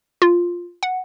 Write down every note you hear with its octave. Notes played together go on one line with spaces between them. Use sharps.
F4
F#5